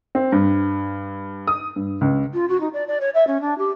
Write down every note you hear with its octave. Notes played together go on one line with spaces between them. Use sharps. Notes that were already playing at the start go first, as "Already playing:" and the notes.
C4
G2
D#6
G2
C#2
F4
F#4
D#4
D5
D5
C#5
E5
C#4
D4
G4